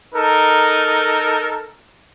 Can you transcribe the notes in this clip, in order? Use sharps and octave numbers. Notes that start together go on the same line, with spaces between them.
D#4 A4 A#4